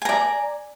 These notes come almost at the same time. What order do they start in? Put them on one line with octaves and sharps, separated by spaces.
G#5 A#5 D5